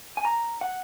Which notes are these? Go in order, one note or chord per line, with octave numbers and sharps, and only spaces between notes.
G#5
A#5
F#5